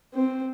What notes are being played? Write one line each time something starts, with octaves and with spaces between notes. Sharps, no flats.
C4